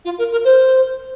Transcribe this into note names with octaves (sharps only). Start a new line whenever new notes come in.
F4
A#4
A#4
C5